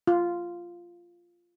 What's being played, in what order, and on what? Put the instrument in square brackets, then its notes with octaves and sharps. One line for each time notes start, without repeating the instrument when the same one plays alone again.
[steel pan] F4